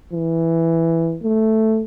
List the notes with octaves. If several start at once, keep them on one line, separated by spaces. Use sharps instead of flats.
E3
A3